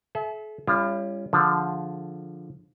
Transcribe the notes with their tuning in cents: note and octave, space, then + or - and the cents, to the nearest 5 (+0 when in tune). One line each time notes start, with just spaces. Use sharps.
A4 -45 E5 +0
G3 +35 C#4 +0 F4 -35
D3 +0 F3 +0 G#4 -10